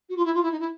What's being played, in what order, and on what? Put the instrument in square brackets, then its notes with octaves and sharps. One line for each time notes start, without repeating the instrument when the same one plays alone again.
[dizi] F#4
F4
E4
F4
E4
D#4
E4